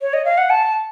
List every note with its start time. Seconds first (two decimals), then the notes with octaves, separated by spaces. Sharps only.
0.02 C#5
0.13 D#5
0.25 F5
0.38 F#5
0.50 A5